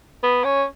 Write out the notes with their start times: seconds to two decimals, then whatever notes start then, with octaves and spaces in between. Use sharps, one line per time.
0.23 B3
0.44 C#4